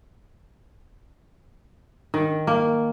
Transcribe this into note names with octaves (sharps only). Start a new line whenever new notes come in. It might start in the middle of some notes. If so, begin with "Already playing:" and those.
D#3
A#3